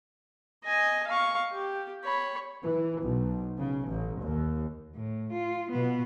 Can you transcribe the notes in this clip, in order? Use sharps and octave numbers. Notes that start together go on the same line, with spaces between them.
D#5 G#5
F5 C#6
G4
C#5 B5
E3
B1
C#3
A1
D#2
A2
F4
B2 B3